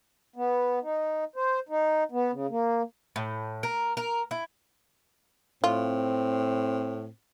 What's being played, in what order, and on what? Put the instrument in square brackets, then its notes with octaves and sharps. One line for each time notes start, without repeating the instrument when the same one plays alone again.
[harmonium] B3
D#4
C5
D#4
B3
C#3
A#3
[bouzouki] A2
A#4
A#4
E4
[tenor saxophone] A2 [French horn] C4 [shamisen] F4